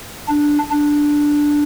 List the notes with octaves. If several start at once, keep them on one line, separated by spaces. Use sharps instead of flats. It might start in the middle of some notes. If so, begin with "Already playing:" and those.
D4
D4